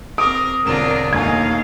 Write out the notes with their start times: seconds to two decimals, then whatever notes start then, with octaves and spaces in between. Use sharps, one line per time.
0.18 C4 A#4 D6 D#6 D7
0.65 E1 D3 C4 D4 F4 A#4 E7
1.13 E1 D2 D#3 A#3 D#4 F5 G#5 G#6